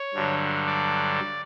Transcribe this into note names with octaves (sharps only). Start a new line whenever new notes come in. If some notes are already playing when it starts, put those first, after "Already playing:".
Already playing: C#5
G2 D3 F#3
D5